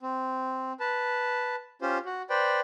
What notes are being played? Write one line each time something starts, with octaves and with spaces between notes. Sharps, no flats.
C4
B4 A5
C#4 F4 G4 C5
F#4
B4 C5 D5 G5